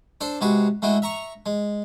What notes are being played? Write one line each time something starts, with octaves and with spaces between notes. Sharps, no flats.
D4 A4 C5 D6
C3 G#3 F#4 B4
G#3 A3 E4 F#4
E5 A#5 C#6
G#3